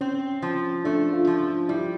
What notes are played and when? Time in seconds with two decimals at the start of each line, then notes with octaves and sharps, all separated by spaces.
0.01 C4 C#4
0.42 F3
0.85 A3 D4
1.13 F4
1.27 F3
1.69 G3 E4